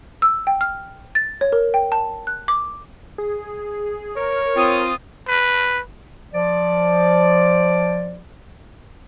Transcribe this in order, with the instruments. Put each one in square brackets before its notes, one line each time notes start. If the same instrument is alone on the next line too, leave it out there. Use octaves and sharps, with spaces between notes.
[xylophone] E6
G5
F6
A6
C#5
A#4
G5
A5
F#6
D6
[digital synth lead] G#4
[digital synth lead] A#4 [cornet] C#5
[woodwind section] C4 F4 D#6
[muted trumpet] B4
[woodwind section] F3 D5